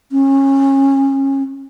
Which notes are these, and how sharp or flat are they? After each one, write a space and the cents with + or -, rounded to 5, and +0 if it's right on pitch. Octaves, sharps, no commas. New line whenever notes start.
C#4 -25